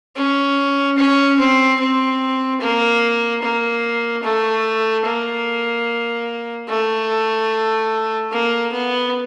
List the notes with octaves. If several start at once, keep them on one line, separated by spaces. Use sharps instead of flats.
C#4
C#4
C4
C4
A#3
A#3
A3
A#3
A3
A#3
B3